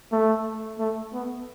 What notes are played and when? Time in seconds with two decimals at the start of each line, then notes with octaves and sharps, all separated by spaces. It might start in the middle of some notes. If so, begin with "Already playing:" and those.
0.12 A3
0.79 A3
1.13 B3